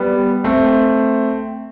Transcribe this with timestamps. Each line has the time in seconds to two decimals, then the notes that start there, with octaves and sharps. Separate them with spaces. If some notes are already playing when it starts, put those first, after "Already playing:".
Already playing: G3 B3
0.44 A3 C4